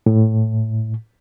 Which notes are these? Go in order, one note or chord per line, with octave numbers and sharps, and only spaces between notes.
A2